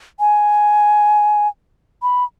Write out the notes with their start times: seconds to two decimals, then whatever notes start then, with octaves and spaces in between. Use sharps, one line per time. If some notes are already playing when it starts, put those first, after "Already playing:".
0.20 G#5
2.02 B5